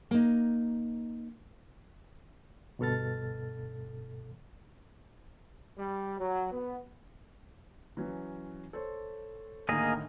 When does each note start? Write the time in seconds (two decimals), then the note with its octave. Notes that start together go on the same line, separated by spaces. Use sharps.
0.11 A#3 D#4
2.79 D2 G2 B2 A4 F6 A6
5.78 G3
6.19 F#3
6.52 B3
7.97 E3 F#3 C#4
8.73 A4 C5 C#5
9.69 A2 D3 D#3 A#3 G#4 D#5